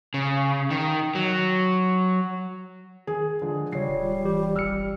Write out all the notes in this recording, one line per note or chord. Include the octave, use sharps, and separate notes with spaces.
C#3
D#3
F#3
D#3 G#4
D3 F3 G#3
C#3 G3 F4 C#5 C7
D1
E3 G4
G#1 E6 F6 C#7